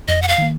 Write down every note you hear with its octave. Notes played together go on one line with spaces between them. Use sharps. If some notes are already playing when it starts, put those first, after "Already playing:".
F2 D#5
F#5
F5
D#3 A#3